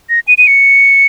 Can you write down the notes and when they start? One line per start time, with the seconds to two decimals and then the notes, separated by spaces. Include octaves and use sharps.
0.10 A#6
0.28 D#7
0.38 D#7
0.47 C#7